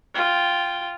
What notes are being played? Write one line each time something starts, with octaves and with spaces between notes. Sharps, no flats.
F4 G5